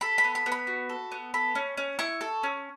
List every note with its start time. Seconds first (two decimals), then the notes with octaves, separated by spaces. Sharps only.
0.01 A4 B5
0.18 B5
0.24 B3
0.35 B5
0.46 B3
0.52 B5
0.67 F#4
0.89 A4
1.12 B3
1.34 A4 B5
1.55 C#4
1.77 C#4
1.99 E4 C#6
2.21 A4
2.43 C#4